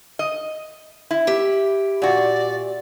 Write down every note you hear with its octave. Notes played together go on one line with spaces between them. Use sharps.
D#5
E4
G4 E5
A#2 F#4 D5